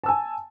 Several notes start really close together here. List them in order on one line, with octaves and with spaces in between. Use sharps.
A5 E6 G#5